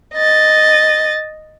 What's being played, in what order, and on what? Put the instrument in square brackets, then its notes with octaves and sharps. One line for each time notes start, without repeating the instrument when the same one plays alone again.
[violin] D#5 A6